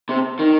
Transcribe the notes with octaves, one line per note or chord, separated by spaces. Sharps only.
C3
D#3